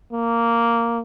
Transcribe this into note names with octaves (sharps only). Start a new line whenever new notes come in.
A#3